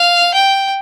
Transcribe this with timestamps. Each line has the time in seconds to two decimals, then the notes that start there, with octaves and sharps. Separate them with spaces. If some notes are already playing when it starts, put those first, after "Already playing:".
Already playing: F5
0.34 G5